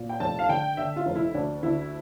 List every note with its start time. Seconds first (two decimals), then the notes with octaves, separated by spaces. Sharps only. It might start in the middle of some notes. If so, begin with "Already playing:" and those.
Already playing: A#2
0.09 G5
0.20 F1 A5
0.39 F5
0.49 D3 G5
0.77 D3 E5
0.96 F4
1.06 F1
1.15 E4
1.34 D2 D4
1.63 D3 E4